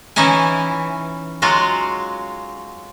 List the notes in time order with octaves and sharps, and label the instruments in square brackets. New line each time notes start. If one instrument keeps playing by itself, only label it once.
[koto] E3 C#4 D#4 E4 G#5
F#3 G#3 F4 F#4